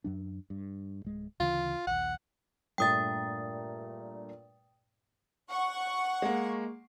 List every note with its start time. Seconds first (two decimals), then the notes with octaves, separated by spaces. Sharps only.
0.04 F#2 F#3 D4
0.50 G2
1.04 D1 G#3
1.40 D2 C#3 E3 F4
1.87 A#1 D#2 F#5
2.78 G2 A#2 A3 G5 D#6 A6
5.50 F#5 C#6
6.22 G#3 A#3